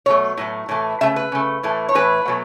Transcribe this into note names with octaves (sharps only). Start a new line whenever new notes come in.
B2 F#3 A3 C#5
A2 F#3 A3
A2 E3 A3
C#3 A3 E5
B4
C#3 A3
A2 E3 A3
C#5
A2 E3 A3 B4
B2 F#3 A3